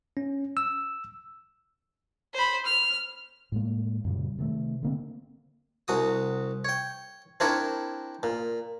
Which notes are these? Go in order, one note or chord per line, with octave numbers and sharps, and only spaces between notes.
C#4
E6
C5 B5
F6
A2 G#3 A#3
F#2 A#2 C#3 G3
C3 D#3 F#3 A3
D3 A#3 C4
C2 F#4 D#6
C#5 G5
C4 D4 E4 A#4 C#5 E5
A#2